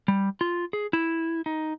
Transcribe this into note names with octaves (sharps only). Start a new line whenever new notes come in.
G3
F4
G#4
E4
D#4